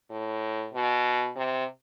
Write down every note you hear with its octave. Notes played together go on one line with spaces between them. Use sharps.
A2
B2
C3